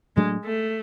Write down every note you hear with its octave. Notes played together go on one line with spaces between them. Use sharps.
A2 F#3 G#3 A3 D4
A3